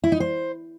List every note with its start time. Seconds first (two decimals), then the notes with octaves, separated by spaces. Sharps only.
0.04 E4
0.12 D#4
0.20 C5